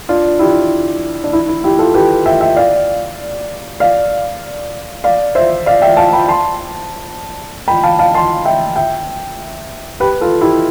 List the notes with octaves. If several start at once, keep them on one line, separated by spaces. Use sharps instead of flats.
D4 F4
E4 G4
D4
E4
E4
E4 G4
F4 A4
G4 B4
E5 G5
E5 G5
D5 F5
D5 F5
D5 F5
C5 E5
D5 F5
E5 G5
F5 A5
G5 B5
A5 C6
G5 B5
F5 A5
F5 A5
A5 C6
E5 G5
E5 G5
G4 B4
F4 A4
E4 G4